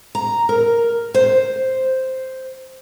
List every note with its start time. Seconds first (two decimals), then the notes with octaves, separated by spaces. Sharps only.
0.15 A#5
0.49 A#4
1.14 C5